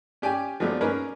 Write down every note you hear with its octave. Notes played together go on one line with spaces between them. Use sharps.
C#4 G4 D5 G#5
F3 F#3 G#3 A3 B3 D4
A#3 C#4 D#4 G#4 A#4 B4